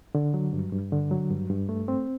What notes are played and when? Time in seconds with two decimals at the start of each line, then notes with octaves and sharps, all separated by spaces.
0.15 D3
0.34 F#3
0.53 G2
0.73 G2
0.92 D3
1.11 F#3
1.30 G2
1.50 G2
1.69 A3
1.88 C4